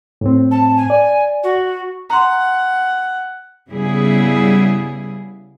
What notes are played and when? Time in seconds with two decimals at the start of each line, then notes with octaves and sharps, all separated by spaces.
0.21 A2 C4
0.51 A5
0.77 G#5
0.90 D5
1.43 F#4
2.10 F#5 A#5 C6
3.70 C#3 G3 B3 E4 G#4